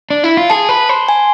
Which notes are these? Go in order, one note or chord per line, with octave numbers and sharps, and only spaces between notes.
D4
E4
F4
G#4 A5
B4
C5
G#5